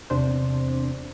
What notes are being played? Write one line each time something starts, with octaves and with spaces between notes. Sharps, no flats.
E2 C3 D4 C5